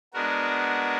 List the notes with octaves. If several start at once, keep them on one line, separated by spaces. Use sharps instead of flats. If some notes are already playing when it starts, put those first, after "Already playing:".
G#3 B3 D4 F#4 A#4